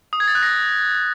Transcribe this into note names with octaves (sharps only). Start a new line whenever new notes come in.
D#6
G#6
A6
F#6
A#6